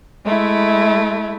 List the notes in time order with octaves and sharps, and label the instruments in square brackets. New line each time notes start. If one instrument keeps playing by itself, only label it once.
[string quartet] G#3 A3 E4